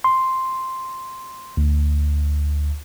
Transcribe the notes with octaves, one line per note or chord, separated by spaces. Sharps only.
C6
D2